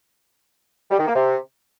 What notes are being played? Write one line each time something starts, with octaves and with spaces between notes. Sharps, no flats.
G3
D#3
A#3
C3